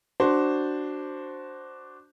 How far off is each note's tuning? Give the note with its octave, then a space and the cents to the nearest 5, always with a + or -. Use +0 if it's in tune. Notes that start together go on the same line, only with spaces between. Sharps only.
D4 +0 F#4 +10 C5 +0